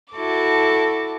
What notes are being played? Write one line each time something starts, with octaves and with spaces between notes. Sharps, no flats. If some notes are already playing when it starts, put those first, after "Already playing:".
E4 F#4 A4 A5 D6